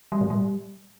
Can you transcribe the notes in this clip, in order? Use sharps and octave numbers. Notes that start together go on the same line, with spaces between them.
G3
A2
G3